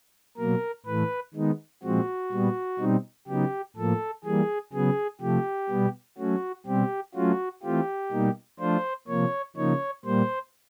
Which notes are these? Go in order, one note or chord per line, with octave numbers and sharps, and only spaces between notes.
B2 F#3 A#3 A#4
A2 E3 A3 B4
D#3 G#3 B3 D#4
A#2 F3 G#3 C4 F#4
A#2 G3 B3
B2 G3 C4 D#4
C#3 F#3 B3 D#4 G4
A2 F3 A#3 A4
E3 G3 A#3 G#4
C#3 F#3 B3 G#4
C3 F3 A3 G4
B2 G3 B3
F#3 A3 C#4 F#4
B2 G3 C4 G4
F#3 A3 C#4 F4 F#4
E3 A3 C4 F4 G4
B2 G3 A#3 D#4
F3 A3 D4 F4 C5
C3 F3 A#3 C#5
C#3 F3 A#3 D#4 C#5
A#2 G3 A#3 C5